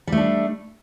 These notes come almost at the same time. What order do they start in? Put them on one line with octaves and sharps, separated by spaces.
G3 A3 D4